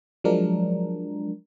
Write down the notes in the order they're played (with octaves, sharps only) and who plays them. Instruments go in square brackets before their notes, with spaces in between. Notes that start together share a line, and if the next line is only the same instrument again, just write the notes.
[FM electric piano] F3 F#3 G#3 D4 A#4